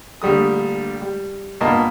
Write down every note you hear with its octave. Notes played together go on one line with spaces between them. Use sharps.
A#1 D3 G3 A3 D#6
G3
G2 A#2 A#3 B3 D#5 A5